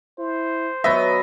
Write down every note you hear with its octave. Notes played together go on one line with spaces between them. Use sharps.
E4 C5
F#3 B3 B4 D#5 E5